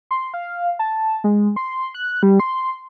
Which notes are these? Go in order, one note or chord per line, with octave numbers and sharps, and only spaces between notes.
C6
F5
A5
G#3
C6
F#6
G3
C6